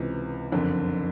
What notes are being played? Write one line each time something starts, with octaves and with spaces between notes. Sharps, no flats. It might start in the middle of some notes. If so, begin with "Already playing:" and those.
Already playing: C#2 C3 E3
F#1 F2 D3